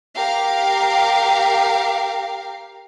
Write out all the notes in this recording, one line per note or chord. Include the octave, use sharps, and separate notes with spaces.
G4 A#4 F5